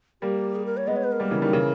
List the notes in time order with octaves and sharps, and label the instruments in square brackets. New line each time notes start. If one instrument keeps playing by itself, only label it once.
[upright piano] G3 A#3 [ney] G4
[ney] G#4
A#4
C#5
[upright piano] G#3 B3 [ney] D#5
[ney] C#5
B4
A#4
[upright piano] G3 A#3
C#3 E3
D#3 G3
C#3 E3